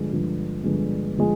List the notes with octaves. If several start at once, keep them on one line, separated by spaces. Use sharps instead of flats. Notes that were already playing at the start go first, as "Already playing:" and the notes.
Already playing: G2 D3 F3 G#3
G2 D3 F3 G#3
G2 D3 F3 G#3
D3 F3 G#3